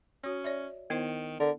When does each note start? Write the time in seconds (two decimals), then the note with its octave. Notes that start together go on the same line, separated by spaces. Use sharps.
0.24 C#4 F#4 C#5
0.44 C#5 D5 E5
0.90 D#3 B3 E4 C5
1.40 D3 A#4